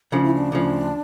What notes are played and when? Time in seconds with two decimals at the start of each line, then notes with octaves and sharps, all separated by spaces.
0.12 D2 C#3 F3 D4
0.23 E4
0.35 D4
0.52 D2 C#3 F3